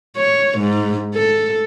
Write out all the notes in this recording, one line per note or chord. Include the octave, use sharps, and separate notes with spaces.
C#5
G#2
A4